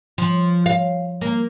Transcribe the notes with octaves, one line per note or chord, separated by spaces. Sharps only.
F3
F5
A#3